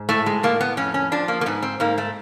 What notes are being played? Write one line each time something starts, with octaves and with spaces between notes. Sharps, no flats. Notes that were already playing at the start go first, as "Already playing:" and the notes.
Already playing: G#2
A2 A3
G#3
A2 A#3
B3
F2 C#4
C#4
F3 D4
A#3
A#3
G#2 B3
C4
G#2 A#3
A3